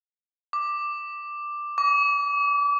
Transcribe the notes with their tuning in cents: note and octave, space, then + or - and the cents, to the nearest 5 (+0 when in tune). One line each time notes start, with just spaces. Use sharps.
D6 +10
D6 -35